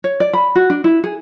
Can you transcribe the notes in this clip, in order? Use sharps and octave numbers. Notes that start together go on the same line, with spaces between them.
C#5
D5
B5
F#4
D4
E4
G#4